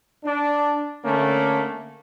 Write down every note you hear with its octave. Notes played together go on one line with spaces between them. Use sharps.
D4
D3 A3 A#3 C#4